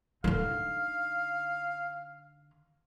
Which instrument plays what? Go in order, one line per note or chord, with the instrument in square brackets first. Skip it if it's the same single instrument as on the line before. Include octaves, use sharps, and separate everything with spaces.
[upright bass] D3 D#4 [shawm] F5